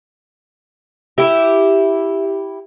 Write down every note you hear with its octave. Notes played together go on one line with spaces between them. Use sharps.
E4 G4 E5